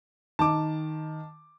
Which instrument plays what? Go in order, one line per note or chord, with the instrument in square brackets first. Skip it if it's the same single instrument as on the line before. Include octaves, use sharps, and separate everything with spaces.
[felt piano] D#3 [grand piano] A5 D6